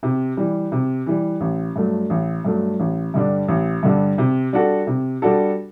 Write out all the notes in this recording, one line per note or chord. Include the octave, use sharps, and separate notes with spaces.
C3
E3 G3
C3
E3 G3
A1
G2 F#3 A3
A1
G2 F#3 A3
A1
G2 D3 G3 D4
A1
G2 D3 G3 D4
C3
G3 D4 F#4 A4
C3
G3 D4 F#4 A4